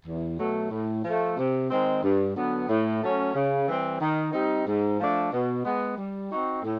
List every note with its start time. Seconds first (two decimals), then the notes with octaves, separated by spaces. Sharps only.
0.05 E2
0.37 B2 F#3 A3
0.70 A2
1.03 F3 A3
1.37 C3
1.69 D#3 G#3 C4
2.02 G2
2.35 D3 F#3 B3
2.68 A2
3.01 F#3 A3 C#4
3.34 C#3
3.67 E3 G3 C4
4.00 D#3
4.32 G3 C4 D#4
4.65 G#2
4.98 F3 A3 D4
5.31 B2
5.63 G#3 B3
5.96 G3
6.30 C4 D#4 F#4
6.63 A2